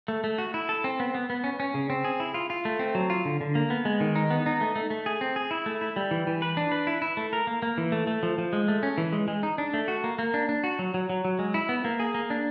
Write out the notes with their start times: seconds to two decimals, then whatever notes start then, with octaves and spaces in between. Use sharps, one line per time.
0.08 A3
0.24 A3
0.38 F#4
0.54 E4
0.69 A4
0.84 C4
1.00 B3
1.15 B3
1.30 B3
1.44 C#4
1.60 C#4
1.74 C#3
1.90 C4
2.04 G#4
2.20 E4
2.34 F4
2.50 F4
2.65 A3
2.79 C4
2.95 F#3
3.10 F4
3.25 D3
3.41 D3
3.55 A#3
3.70 B3
3.85 G#3
4.00 D#3
4.16 D#4
4.31 B3
4.46 D#4
4.61 A3
4.76 A3
4.90 A3
5.06 G#4
5.21 C4
5.36 G#4
5.51 E4
5.66 A3
5.81 E4
5.96 G3
6.11 E3
6.27 E3
6.42 B4
6.57 D4
6.72 B4
6.87 E4
7.02 E4
7.17 A3
7.33 A#4
7.47 A#3
7.62 A#3
7.78 E3
7.92 A3
8.07 A3
8.23 F3
8.38 F3
8.53 G#3
8.68 A3
8.83 C#4
8.98 E3
9.13 G#3
9.28 G#3
9.43 D#4
9.58 D4
9.74 A3
9.88 F#4
10.04 A#3
10.19 A#3
10.34 D4
10.49 D4
10.64 F#4
10.79 F#3
10.94 F#3
11.10 F#3
11.25 F#3
11.39 G#3
11.54 E4
11.69 B3
11.85 A#3
12.00 G#4
12.14 A#3
12.30 D4